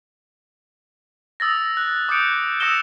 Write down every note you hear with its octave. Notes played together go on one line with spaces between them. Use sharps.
D#6 E6 A6 A#6
F#6
D6 D#6 F#6 G6 C#7 D7
D#6 E6 A#6 C#7 E7 G7